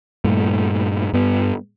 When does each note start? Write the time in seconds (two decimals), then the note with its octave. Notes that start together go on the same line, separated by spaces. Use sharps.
0.24 G2 A#2 A3
1.13 G2 B3